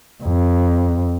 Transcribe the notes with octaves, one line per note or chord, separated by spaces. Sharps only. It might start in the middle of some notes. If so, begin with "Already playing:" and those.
F2